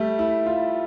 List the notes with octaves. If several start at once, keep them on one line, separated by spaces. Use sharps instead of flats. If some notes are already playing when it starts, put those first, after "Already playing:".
Already playing: G3 A3
E4
F4